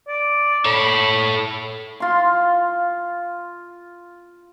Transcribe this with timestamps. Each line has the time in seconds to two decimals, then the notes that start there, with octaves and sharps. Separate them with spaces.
0.07 D5
0.66 A4 C#5 B5
2.00 F4 C6